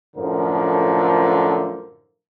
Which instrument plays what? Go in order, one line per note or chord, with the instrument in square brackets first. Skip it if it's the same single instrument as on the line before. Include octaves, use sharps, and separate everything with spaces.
[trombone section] F#2 A2 D3 F3 A#4